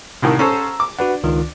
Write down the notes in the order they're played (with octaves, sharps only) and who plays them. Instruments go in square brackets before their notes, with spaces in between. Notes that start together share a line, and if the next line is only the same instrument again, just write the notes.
[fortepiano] C2 A2 D#3 [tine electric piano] C3
[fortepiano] C#4 A4 C5 [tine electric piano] A#5 E6
[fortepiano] D6
[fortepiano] D4 [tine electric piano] F#4 B4 F#5
[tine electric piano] C#2 D#3 F4